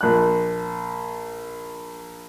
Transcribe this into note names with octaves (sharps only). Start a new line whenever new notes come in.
A#1 F#6